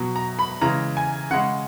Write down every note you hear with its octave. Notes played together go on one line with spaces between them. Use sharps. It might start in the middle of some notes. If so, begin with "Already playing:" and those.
Already playing: B2 F#3
A#5
B5
C#3 E3 G#3 A#5
G#5
C#3 G#3 F#5